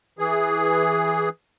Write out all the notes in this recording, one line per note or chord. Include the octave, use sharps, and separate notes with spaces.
E3 G#4